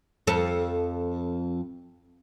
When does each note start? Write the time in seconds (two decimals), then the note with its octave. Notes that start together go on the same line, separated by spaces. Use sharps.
0.27 F2 A4